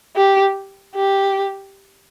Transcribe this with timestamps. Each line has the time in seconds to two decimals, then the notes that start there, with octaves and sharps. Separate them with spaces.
0.16 G4
0.95 G4